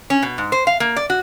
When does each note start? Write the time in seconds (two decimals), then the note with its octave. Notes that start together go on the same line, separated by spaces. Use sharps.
0.10 C#4
0.23 B2
0.38 G#2
0.52 C5
0.67 F5
0.80 A#3
0.97 D5
1.10 F#4